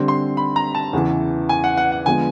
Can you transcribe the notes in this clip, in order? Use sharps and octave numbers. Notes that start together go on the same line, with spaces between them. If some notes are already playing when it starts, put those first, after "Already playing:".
Already playing: D3 G3 C4
C6
B5
A#5
A5
E2 C#3 E3
G#5
F#5
F#5
F#5
D3 F3 G#3 B3 G#5